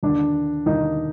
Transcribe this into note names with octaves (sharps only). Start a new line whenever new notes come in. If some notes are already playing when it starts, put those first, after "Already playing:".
D#2 D3 D4
D#2 D3 D#4